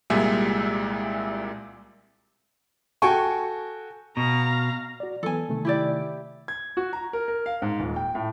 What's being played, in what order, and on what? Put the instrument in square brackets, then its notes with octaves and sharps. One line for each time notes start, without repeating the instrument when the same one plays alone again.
[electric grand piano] C2 A#2 G3 G#3 E5 G#5
[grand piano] F#4 A4 G5 G#5 C#6
[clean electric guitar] B2 [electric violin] F5 A#5
[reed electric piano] F#4 D5
[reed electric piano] E3 F#3 B3 [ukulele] A4 G#5
[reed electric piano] C3 D#3 A3
[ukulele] E4 G4 D5
[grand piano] G#6
F#4
A#5
A#4
A#4
F5
G#2
D#1
G5
A2